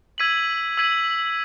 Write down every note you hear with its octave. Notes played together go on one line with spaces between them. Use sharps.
E6 G#6 B6 D#7 F#7
E6 G#6 B6 D#7 F#7